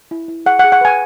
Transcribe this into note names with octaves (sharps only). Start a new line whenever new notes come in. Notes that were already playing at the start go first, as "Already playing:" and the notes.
E4
E4
G#4 F#5
F#5
G#4
F#5
B4 G#5